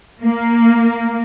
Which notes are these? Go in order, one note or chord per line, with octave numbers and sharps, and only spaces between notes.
A#3